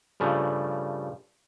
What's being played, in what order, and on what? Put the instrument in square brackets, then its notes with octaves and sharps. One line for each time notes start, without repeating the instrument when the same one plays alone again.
[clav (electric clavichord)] G2 C#3 F3 A3